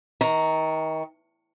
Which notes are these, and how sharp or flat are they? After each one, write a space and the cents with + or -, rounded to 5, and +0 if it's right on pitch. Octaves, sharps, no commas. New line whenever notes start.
D#3 +35 A#5 -5